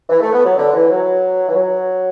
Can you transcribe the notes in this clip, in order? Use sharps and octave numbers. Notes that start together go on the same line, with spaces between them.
E3
A3
B3
F#3
D3
E3
F#3
E3
F#3